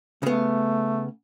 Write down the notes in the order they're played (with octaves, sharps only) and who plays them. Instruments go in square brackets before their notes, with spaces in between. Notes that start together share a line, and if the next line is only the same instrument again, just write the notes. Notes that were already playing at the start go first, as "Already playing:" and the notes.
[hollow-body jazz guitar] C#3 B3 [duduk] A3